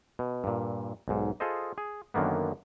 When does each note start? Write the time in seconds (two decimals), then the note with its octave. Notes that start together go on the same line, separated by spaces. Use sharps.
0.19 B2
0.44 G2 A#2
1.08 B1 G#2
1.40 F4 G#4 A4 C5 D#5
1.78 G#4
2.14 F#2 D3 D#3 A#3 B3